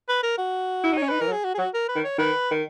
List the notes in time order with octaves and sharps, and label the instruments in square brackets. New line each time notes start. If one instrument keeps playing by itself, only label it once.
[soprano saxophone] B4
A#4
F#4
[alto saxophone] E4
[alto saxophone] D#4 [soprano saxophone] C#5
[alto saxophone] C#4
[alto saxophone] D#4 [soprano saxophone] B4
[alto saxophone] E3 [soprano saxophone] A#4
[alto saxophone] F#3
[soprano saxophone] G#4
F#4
G#4
[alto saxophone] F#3 [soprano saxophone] F#4
[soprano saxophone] A#4
B4
[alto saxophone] D#3
[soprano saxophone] C#5
[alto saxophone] D#3 [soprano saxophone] B4
[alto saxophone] D#3